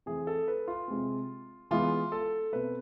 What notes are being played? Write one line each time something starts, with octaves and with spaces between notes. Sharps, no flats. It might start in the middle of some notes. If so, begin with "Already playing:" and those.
E3 A3 C4 G#4
A4
B4
F4
C3 G#3 C4
E3 G#3 B3 F4
A4
B2 A3 C4 B4